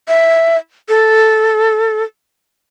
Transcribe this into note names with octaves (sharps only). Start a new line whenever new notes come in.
E5
A4